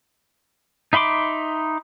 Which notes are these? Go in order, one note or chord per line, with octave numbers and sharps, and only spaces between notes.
D#4 E5 B5 C6 D6